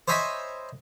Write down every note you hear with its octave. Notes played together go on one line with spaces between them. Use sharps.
C5 C#5 D#5 E5 G#5 B5